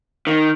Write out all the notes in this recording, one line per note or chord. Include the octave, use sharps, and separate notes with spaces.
D#3